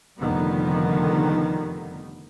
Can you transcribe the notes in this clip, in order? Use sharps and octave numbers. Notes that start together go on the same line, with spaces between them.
F1 F2 D3 D#3 G3 B3